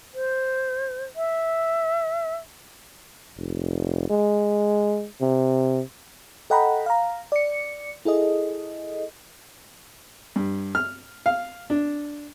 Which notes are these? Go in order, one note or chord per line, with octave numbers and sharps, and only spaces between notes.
C5
E5
F1
G#3
C3
A4 D#5 F#5 G5 A#5 B5
F5 A#5
D5 C#7
E4 G#4 A4 D#5
G2
F6
F5
D4